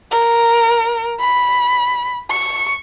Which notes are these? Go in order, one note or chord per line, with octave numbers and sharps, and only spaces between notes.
A#4
B5
C#6